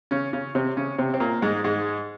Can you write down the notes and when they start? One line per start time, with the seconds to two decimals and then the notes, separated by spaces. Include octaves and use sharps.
0.11 C#3 C#4
0.33 C#3 C#4
0.55 C3 C4
0.77 C#3 C#4
0.98 C3 C4
1.14 C4
1.20 A#2 A#3
1.42 G#2 G#3
1.64 G#2 G#3